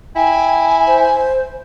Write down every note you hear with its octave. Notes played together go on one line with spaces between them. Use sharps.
E4 G5 G#5
C5